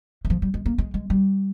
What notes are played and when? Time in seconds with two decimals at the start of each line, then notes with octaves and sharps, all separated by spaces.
0.25 E3
0.30 F3
0.42 G3
0.54 G#3
0.66 A#3
0.78 G#3
0.94 G#3
1.10 G3